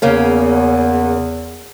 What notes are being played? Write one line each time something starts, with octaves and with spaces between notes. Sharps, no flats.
E2 C#3 A#3 C#4